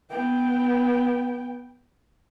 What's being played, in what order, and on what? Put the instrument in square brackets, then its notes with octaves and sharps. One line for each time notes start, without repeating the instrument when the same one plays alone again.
[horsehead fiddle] B3 G5